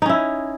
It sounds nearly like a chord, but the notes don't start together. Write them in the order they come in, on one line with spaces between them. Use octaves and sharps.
D#4 C#4 E4